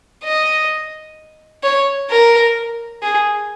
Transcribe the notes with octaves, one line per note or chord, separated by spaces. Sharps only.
D#5
C#5
A#4
G#4